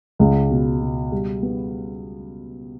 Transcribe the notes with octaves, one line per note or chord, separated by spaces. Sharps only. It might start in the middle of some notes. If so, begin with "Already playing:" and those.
C#2
B2
B2
G3
B3